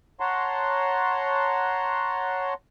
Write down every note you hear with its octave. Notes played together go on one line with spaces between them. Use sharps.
C#5 F#5 A5 A#5 C6